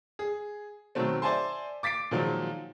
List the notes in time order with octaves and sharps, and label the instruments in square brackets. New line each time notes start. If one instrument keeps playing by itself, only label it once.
[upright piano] G#4
B2 D#3 F#3 A3 C4
C5 D5 E5 G#5 A5 C6
D6 A6 B6 C7 D7
A#2 D#3 F3 F#3 G#3